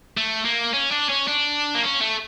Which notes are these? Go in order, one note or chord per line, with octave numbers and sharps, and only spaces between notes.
A3
A#3
C#4
D4
C#4
D4
A#3
C#4
A3